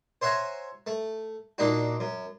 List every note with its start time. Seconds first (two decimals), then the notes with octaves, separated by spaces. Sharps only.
0.21 C5 C#5 E5 F#5 G#5 A#5
0.87 A3
1.58 A#2 A#3 D4 D#4 F#4
2.00 F#2